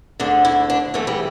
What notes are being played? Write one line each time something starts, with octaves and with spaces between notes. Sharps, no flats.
D2 D3 D4
E4
D4
E2 E3 A3
G3